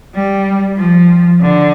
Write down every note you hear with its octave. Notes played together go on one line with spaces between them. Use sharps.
G3
F3
D3